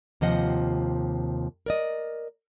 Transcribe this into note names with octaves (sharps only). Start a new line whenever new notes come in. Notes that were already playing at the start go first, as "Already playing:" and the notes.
D#2 C3 F3 F4 D#5 F#5
A#4 D5 D#5